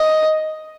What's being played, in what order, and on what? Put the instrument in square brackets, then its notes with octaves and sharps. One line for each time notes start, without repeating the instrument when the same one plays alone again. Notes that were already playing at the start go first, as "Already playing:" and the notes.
Already playing: [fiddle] D#5